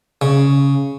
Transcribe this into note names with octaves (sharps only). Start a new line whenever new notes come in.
C#3